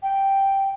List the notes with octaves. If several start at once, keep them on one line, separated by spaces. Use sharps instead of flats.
G5